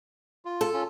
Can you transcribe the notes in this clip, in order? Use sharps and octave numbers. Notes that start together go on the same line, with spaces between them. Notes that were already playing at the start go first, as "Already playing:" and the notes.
F4
A4
C#4 F4